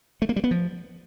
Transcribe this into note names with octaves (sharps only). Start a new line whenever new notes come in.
A3
A#3
G3
B3
F3